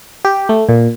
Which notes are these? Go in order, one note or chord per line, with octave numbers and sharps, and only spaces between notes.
G4
A3
A#2